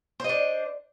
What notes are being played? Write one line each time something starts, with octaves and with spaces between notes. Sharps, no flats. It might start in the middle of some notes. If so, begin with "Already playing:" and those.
D4 C5 D#5